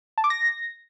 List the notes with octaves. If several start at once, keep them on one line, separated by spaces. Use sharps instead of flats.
A5
D6
A#6